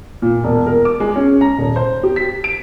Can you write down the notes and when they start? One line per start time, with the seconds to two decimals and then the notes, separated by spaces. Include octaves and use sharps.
0.22 A#2
0.44 E1
0.66 A#4
0.85 D6
1.00 G#3
1.16 C#4
1.41 A#5
1.58 D#1
1.76 C5
2.03 G4
2.16 B6
2.44 D7